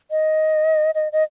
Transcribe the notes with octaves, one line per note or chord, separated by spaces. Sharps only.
D#5
D#5
D#5